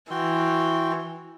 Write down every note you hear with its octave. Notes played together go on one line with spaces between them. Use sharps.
E3 F#4 G5 C6